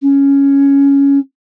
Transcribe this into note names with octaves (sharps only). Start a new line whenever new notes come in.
C#4